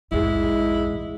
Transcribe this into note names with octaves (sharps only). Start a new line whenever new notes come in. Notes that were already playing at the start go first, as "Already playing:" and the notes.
A#1 E2 G#2 G#3 E4 G#4